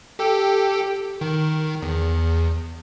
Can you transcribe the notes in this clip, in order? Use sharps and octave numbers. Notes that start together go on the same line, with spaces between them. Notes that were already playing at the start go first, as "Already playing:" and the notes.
G4 A4 G5
D#3
E2